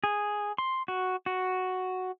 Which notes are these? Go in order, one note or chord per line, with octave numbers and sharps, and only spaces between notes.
G#4
C6
F#4
F#4